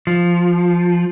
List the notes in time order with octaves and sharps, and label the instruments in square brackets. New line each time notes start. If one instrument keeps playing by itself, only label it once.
[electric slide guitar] F3